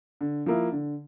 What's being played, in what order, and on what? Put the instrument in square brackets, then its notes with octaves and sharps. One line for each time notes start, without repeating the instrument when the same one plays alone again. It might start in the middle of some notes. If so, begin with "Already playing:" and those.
[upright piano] D3
F3 A#3 E4
D3